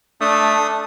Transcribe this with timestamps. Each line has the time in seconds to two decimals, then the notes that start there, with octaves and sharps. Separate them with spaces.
0.21 A3 D4 D#6